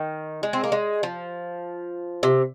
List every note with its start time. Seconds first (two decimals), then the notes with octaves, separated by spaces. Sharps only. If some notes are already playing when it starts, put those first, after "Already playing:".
Already playing: D#3
0.43 G#3
0.53 C4
0.64 A#3
0.72 G#3
1.03 F3
2.23 C3